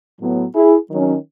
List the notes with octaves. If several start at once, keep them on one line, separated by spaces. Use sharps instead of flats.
A2 F#3 B3
E4 G#4
D#3 F#3 C#4